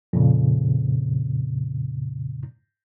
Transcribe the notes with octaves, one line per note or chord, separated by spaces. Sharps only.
F2 A#2 C#3